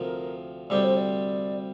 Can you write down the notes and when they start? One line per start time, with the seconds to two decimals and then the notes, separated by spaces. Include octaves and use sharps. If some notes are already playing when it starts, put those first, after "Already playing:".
Already playing: D2 C3 F3 A#4
0.70 D2 C3 G3 C4 G4 D5
0.84 C5
0.96 D5